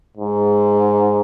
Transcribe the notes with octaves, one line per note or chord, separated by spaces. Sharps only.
G#2